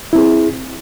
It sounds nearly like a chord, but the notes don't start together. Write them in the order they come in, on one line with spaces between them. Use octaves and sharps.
E4 C4 G#4